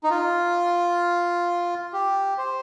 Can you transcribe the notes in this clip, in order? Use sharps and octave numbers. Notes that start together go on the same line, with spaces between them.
D#4
F4
G4
C5